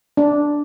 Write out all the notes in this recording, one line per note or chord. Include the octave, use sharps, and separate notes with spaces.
D4